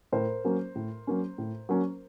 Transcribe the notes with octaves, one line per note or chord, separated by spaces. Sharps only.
A2 A#4 C5
F#3 A#3 C#4
A2
F#3 A#3 C#4
A2
F#3 A#3 C#4